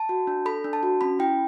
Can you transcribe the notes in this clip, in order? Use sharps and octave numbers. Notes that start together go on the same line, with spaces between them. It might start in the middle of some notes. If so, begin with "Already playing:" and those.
Already playing: A5
F#4
D4
A4 B5
D4
A5
F#4
C#4 B5
E4 G5